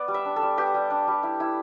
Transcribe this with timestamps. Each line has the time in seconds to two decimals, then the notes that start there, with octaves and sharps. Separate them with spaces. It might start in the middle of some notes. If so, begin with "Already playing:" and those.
Already playing: B3 D5
0.08 G3
0.14 E5
0.25 D4
0.36 A4
0.42 G3
0.57 B3 G4
0.74 G3
0.90 D4
1.08 G3
1.23 E4
1.40 E4